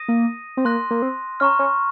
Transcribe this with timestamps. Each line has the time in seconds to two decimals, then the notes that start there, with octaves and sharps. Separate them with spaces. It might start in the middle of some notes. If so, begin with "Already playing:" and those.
Already playing: D#6 A#6 D#7
0.08 A#3
0.57 C4
0.65 A#3 C6 F#6 A#6
0.91 A#3
1.02 C4
1.40 C#4 A#5 C#6 F6
1.59 C#4